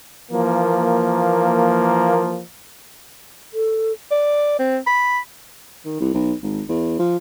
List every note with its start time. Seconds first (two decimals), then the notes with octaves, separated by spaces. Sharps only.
0.31 E3 F3 A#3
3.54 A4
4.11 D5
4.59 C4
4.86 B5
5.85 D#3
6.00 C2
6.14 B1
6.43 G#1
6.69 E2
6.99 F3